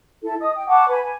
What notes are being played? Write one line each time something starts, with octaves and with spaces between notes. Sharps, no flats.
E4 A4
D#5 D#6
G5
F#5 A5 C#6 D6
B4 G#5 B5
G#5